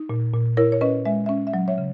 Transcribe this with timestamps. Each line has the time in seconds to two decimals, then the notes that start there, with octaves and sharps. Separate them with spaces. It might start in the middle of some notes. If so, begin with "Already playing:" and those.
Already playing: D#4
0.09 A#2
0.33 A#2
0.57 E4 A#4 C#5
0.72 C#5
0.81 C#4 B4 D#5
1.05 G#3 E5
1.26 C#4 E5
1.47 E5
1.54 F#3
1.68 C#5 E5
1.78 C#3